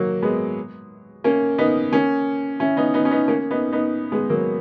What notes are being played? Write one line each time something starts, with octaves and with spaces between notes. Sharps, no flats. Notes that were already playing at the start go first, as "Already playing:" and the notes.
Already playing: F#3 A#3
G#3 B3
A#3 C#4
B3 D#4
A#3 C#4
C#4 E4
B3 D#4
B3 D#4
C#4
B3 D#4
A#3 C#4
B3 D#4
B3 D#4
G#3 B3
F#3 A#3